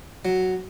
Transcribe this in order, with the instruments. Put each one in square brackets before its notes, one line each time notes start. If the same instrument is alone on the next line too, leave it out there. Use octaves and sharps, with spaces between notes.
[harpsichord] F#3